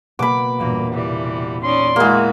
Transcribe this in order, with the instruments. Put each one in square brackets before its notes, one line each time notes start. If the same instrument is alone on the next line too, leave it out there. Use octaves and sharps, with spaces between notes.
[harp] B2 A#3 [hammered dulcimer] B5 D6
[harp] E1 A#2 [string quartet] G2 A#3
[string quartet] C3 E3 G3
[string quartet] C#4 D#4 D5 [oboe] C6
[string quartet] E3 F#4 [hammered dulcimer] G#3 A#3 [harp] G#4